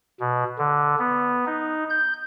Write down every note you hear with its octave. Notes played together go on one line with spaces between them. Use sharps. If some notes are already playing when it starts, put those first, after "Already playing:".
B2
D3
B3
D#4
G6